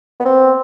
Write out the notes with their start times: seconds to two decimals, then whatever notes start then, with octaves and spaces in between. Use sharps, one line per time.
0.20 B3
0.25 C4